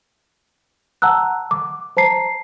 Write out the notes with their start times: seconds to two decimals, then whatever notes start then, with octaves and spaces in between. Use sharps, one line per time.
1.02 F#5 A5 A#5 E6 F#6
1.51 D6
1.97 C5 A5 A#5 C7